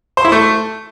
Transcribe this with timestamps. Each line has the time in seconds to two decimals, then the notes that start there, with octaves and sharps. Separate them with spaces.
0.17 C5
0.25 E4
0.32 A3